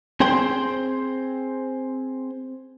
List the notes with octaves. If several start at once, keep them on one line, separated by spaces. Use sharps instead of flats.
C4 G#4 C5 G5 C6